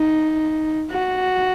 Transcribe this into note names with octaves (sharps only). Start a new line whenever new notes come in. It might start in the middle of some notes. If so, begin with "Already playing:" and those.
Already playing: D#4
F#4